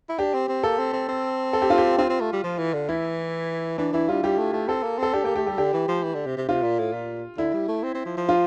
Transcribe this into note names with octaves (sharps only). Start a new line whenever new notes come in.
E4
D4 G4
C4
C4
A#3 A4
C4
C4
C4
A4
G4
F4
G4
C4 F4
C4
A3
G3
F3
E3
D3
E3 E4
E3 D4
E3 E4
G3 F4
G3 G4
A3
A3
C4 A4
A#3
C4 A4
D4 G4
A#3 G4
A3 G4
G3 G4
D3 G4
E3
F3
E3
D3
C3
C3
C3 F4
A#2
A2
A#2
D3 E4
G3
A3
C4
C4
F3
F3
F4